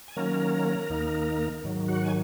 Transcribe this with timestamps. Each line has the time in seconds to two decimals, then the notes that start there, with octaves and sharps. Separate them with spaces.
0.08 G#5
0.16 D#3 F#3 A#3 C#4 A#4 A#5
0.90 D#2 D#3 A#3 D#4
1.64 G#2 D#3 F#3
1.88 F#4 F#5
2.04 G#5